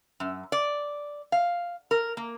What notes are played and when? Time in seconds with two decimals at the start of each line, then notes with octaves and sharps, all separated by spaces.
0.20 F#2
0.52 D5
1.32 F5
1.91 A#4
2.17 A#3